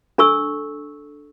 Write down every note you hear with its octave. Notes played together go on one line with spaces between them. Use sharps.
D4 A4 C#6 E6